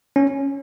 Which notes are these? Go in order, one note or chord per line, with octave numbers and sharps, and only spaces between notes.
C#4